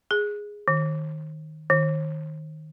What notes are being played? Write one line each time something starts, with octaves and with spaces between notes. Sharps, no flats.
G#4
D#3
D#3